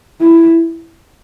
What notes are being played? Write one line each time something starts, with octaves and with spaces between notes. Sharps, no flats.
E4